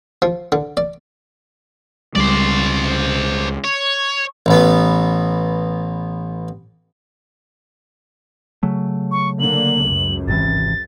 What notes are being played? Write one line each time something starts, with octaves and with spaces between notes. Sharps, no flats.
F3
D3
D5
C#2 G3 G#3 C5 D5
C#5
A1 B3
C#3 F#3 A3
C#6
D3 A#3 F#7
C#2 F#2
G#1 C3 E3 A6